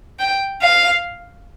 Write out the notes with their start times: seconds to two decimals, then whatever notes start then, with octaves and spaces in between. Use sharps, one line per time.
0.19 G5
0.62 F5